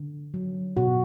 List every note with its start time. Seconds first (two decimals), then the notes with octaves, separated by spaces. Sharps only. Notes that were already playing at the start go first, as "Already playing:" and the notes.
Already playing: D3
0.34 F#3
0.77 B2 F#4